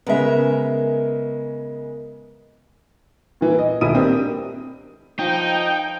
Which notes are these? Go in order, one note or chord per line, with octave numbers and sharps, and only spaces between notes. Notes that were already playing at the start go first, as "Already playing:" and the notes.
C#3 G#3 B3 A#4 E5
A#2 E3
D#5
D#1 B1 G#3 E4 D#6 D#7
A#3 C4 D4 G4
F3 D#4 G5